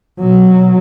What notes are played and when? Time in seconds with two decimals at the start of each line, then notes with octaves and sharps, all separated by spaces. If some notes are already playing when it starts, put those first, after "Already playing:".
0.20 B2 F#3